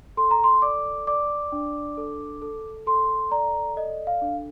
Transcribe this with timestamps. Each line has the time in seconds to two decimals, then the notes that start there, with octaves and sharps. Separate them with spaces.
0.17 A4 C6
0.31 A#5
0.44 C6
0.62 D5 D6
1.07 D5 D6
1.52 D4
1.97 A4
2.42 A4
2.87 A4 C6
3.31 D5 A#5
3.76 A4 D#5
4.07 F5
4.22 D4